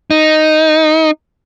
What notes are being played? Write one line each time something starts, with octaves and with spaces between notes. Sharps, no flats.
D#4